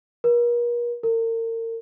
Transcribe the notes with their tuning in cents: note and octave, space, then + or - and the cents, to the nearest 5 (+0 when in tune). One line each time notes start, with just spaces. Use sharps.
A#4 +40
A#4 -40